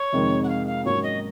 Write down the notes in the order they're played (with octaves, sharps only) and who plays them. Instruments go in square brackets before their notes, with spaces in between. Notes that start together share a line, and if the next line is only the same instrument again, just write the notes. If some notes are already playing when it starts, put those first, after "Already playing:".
Already playing: [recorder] C#5
[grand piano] F2 C3 D#3 G#3 D#4
[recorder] F#5
F5
F5
[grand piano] G#2 F#3 A#3 C#4 [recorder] C#5
[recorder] D#5